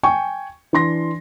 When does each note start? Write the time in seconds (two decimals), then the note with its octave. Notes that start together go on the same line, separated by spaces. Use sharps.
0.03 G5 G#5 C#6
0.73 E3 D4 C6 A#6